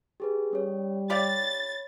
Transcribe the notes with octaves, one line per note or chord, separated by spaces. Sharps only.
G4 G#4 B4
G3 C#4 C#5
G4 C#5 D5 F5 B5 A6